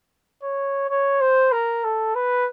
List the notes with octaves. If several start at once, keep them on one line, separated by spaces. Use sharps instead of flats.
C#5
C#5
C5
A#4
A4
B4